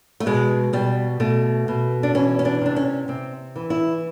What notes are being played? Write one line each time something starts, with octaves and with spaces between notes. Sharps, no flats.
A3
B2 G#3
B2 G3
B2 A3
B2
D4
E3 C#4
C#4
D4
C3 D4
C#4
C3 C4
E3
E4